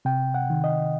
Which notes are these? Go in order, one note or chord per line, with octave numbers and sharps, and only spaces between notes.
C3 G5
F#5
D#3
D#5